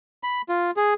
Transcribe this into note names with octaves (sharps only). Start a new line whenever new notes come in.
B5
F4
G#4